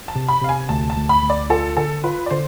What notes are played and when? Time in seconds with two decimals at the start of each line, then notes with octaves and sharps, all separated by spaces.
0.08 A5
0.16 C3
0.28 B5
0.41 C3 F5
0.49 G#5
0.69 D2 A5
0.90 A5
0.96 D2
1.09 B5
1.23 D2
1.30 D5
1.50 F4 A4
1.77 D3 A4
2.04 F4 B4
2.26 D5
2.31 D3 C5